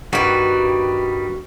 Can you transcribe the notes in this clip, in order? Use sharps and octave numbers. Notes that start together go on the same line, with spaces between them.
G2 D#3 G3 F#4 B4